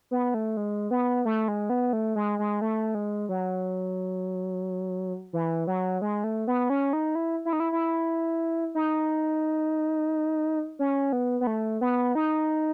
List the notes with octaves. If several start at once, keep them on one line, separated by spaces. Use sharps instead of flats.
B3
A3
G#3
B3
A3
G#3
B3
A3
G#3
G#3
A3
G#3
F#3
E3
F#3
G#3
A3
B3
C#4
D#4
E4
E4
D#4
E4
E4
D#4
C#4
B3
B3
A3
B3
D#4